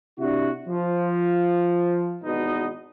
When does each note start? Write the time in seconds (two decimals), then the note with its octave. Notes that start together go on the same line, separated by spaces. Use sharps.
0.19 C3 D4 E4 F#4
0.68 F3
2.24 G#1 E2 B2 D#4 B4 D#5